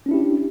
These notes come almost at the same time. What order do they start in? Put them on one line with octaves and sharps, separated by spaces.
C#4 D4 E4 G4